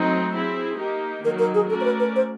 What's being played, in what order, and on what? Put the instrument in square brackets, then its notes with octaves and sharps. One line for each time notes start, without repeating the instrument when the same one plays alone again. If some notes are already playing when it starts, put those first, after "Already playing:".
Already playing: [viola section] F#3 A3 C4 D#4
C4 E4 G#4
A#3 D#4 G4
[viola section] D#3 F#3 A#3 D#4 [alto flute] A#4
[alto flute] A#4
G#4
[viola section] A3 C#4 F#4 A#4 D5 [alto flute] A4
[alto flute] C5
B4
B4
C5